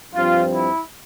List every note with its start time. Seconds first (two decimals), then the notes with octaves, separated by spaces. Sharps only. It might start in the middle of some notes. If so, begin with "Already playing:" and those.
0.14 G2 F3 C4 F4
0.53 E4